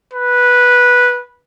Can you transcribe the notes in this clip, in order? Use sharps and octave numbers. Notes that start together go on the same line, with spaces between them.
B4